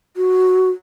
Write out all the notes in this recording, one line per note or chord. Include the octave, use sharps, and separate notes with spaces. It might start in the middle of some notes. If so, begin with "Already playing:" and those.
F#4